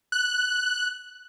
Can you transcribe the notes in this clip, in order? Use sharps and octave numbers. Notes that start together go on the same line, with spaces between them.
F#6